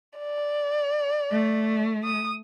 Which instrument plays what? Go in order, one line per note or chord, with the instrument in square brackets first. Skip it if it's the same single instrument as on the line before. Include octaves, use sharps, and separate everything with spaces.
[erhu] D5
[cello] A3
[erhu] D#6